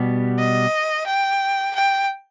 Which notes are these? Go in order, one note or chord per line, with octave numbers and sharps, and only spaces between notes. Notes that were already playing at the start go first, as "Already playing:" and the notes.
Already playing: B2 G3 B3 G4
D#5
G5
G5